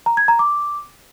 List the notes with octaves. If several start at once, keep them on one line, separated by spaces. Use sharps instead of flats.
A#5
G#6
A#5
D6